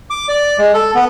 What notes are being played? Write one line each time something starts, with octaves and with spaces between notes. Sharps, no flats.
D6
D5
G#3
A4
B3